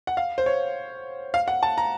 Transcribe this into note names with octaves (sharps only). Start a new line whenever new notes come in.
F#5
F5
C5
C#5
F5
F#5
A5
A#5